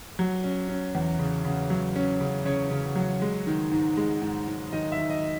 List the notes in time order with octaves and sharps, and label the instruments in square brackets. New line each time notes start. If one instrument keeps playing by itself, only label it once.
[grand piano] F#3
C#4
C#4
E2
C#3
C#3
F#3
C#4
C#3
C#3 C#5
C#3
F#3
G#3
D#3
G#2
G#3
G#2
G#2
D#3 D#5
E5
D#3
D#5